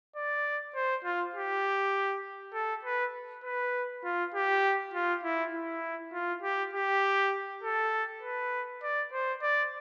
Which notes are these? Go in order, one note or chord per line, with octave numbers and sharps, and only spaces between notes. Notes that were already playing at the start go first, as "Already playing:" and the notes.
D5
C5
F4
G4
A4
B4
B4
F4
G4
F4
E4
E4
F4
G4
G4
A4
B4
D5
C5
D5